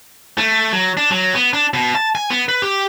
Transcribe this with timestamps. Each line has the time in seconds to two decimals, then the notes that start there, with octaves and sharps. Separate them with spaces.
0.38 A3
0.73 F#3
0.97 D4
1.11 F#3
1.35 B3
1.53 D4
1.74 B2
1.95 A5
2.15 G#5
2.31 B3
2.49 B4
2.62 G4